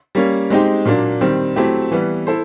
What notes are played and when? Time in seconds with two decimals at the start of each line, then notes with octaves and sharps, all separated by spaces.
0.15 G3 A#3 C#4
0.50 G#3 C4 D#4 G4
0.85 A#2 F#3 A#3 D4
1.21 D#3 G3 C4
1.56 F#3 A3 C4 E4 G4
1.92 E3 G3 B3
2.27 E4 A4 C5